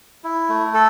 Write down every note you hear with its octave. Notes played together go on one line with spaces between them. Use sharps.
E4
A3
A4